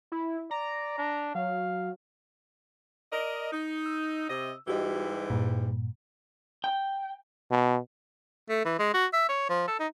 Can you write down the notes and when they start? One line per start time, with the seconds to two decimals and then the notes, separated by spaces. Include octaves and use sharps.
0.12 E4
0.51 D5 A#5
0.98 D4
1.35 F#3 F5
3.13 A#4 D5 D#5
3.52 D#4
3.86 E6
4.29 C3 D#5
4.68 G#2 E3 G3 F#4 G4 D#5
5.30 G2 A#2
6.64 G5
7.51 B2
8.49 A3
8.65 E3
8.79 G#3
8.94 F#4
9.13 E5
9.29 C#5
9.49 F3
9.67 A4
9.79 D#4